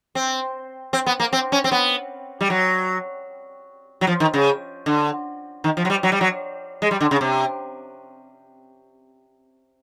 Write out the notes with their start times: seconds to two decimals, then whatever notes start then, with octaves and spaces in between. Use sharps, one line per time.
0.15 C4
0.93 C4
1.06 B3
1.20 A#3
1.33 C4
1.52 C#4
1.64 C4
1.72 B3
2.41 G3
2.50 F#3
4.01 F#3
4.07 F3
4.20 D#3
4.34 C#3
4.86 D3
5.64 D#3
5.77 F3
5.85 F#3
5.90 G3
6.03 F#3
6.12 G3
6.21 F#3
6.82 G#3
6.91 G3
7.01 D3
7.11 C#3
7.21 C3